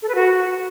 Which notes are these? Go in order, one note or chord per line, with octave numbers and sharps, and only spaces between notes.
A4
B4
F#4